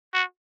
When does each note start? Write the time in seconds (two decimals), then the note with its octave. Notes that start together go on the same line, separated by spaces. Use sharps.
0.14 F#4